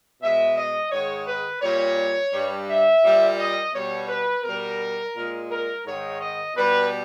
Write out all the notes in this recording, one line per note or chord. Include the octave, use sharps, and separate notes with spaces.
B2 G#3 E5
D#5
G#2 D#3 G#3 C#5
B4
A#2 G3 C#5
G2 G3
E5
A#2 G3
D#5
B2 G3 C#5
B4
B2 G3 A#4
A#2 G#3
A#4
G#2 D#3 G#3 C#5
D#5
B2 G3 B4